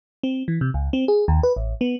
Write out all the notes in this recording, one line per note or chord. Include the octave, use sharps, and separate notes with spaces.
C4
E3
C3
C#2
C4
G#4
D#2
B4
A1
B3